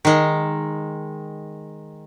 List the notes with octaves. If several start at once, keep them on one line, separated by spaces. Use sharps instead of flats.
D#3 G#3